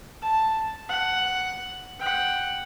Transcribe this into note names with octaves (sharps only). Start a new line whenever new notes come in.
A5
F#5
F#5 G5